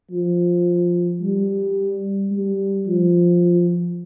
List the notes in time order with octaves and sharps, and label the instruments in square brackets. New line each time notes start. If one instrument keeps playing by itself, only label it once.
[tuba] F3
G3
G3
F3